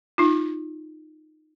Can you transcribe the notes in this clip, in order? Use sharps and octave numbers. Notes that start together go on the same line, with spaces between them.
D#4 F4